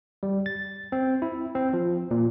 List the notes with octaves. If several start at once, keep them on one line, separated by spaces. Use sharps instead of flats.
G3
A6
C4
E4
C4
F3
A#2